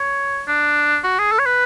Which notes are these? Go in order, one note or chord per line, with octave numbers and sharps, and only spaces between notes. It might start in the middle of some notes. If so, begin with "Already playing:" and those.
Already playing: C#5
D4
F#4
G#4
A4
C#5
B4